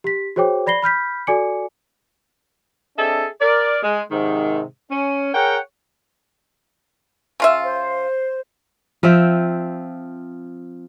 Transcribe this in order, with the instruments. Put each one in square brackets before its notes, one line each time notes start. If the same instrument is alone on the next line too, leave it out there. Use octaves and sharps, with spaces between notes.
[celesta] G4 B6
F#4 G#4 C5 C#5 G5 D6
D5 B5 A#6 C7 G7
B5 F6 G6 B6
F#4 A4 D5 G#5 D6 C#7
[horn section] C4 D4 G#4 A4 D#5 E5
A#4 D5
G#3
G#2 C3 D#3
C#4
G#4 A#4 C#5 F#5 G5
[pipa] C#3 F4 E5
[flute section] C5
[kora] F3 C4 E5 G5